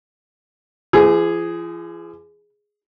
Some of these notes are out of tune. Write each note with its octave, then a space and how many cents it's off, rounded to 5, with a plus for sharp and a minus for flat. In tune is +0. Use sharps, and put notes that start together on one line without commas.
F3 -45 G#4 +0